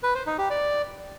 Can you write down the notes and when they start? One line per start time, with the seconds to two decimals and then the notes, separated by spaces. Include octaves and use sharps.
0.03 B4
0.15 C5
0.27 D#4
0.38 G4
0.50 D5